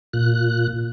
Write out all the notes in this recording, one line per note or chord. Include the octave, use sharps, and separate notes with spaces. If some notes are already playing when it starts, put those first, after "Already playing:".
A#2 F#6